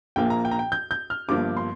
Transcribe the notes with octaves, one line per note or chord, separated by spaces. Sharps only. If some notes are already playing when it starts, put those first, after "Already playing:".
A#1 A#2 F3 A#3 G5
A#5
G5
A#5
G5
G6
G6
F6
G1 G2 F3 A#3 D6
C6